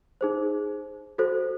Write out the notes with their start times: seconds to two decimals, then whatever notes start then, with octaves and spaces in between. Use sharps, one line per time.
0.21 D#4 G#4 C5
1.18 F#4 A4 C5